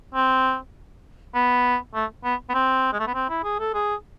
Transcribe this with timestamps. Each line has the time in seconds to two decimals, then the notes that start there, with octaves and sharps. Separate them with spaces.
0.15 C4
1.34 B3
1.95 A3
2.24 B3
2.49 B3
2.54 C4
2.93 G#3
3.00 A3
3.07 B3
3.14 C4
3.29 E4
3.44 G#4
3.59 A4
3.74 G#4